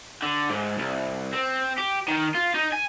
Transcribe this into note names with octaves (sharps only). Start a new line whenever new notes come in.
D3
G#2
C2
C4
G4
D#3
F4
D#4
G#5